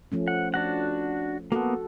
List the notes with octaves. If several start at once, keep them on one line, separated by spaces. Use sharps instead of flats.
F3 A3 C#4
F#5
D4 F#4 F#5
A#3 B3 F#4 A4